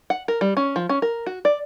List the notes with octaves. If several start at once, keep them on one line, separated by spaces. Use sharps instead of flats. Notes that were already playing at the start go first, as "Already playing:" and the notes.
F#5
A#4
G3
C#4
F3
C#4
A#4
F#4
D5